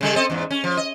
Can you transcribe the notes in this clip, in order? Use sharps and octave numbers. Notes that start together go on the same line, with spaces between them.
C#3 G3 A4
C4 A4 D#5
E2 G#2
C#4
F3
D#5